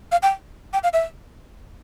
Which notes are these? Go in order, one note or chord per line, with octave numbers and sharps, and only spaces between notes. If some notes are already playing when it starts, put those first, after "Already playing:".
F5
G5
G5
F5
E5